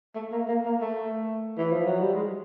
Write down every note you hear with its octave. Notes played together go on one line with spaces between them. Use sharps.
A3
A#3
A#3
A#3
A3
E3
F3
F#3
G3
G#3